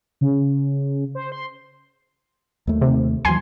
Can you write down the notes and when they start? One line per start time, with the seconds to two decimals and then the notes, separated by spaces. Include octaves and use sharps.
0.21 C#3
1.15 C5
1.32 C6
2.67 D#2 D#3 A3
2.82 C3
3.25 D#2 E3 F#3 G#5 C6